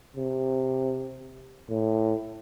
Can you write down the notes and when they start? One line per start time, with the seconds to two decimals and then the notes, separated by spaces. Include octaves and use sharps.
0.17 C3
1.69 A2